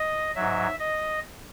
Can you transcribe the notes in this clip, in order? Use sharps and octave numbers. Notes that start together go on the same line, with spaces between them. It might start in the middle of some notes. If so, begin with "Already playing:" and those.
Already playing: D#5
G#2 F#3 E5
D#5